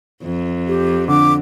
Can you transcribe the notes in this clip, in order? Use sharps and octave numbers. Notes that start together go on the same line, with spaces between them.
F2
G4
D3 D6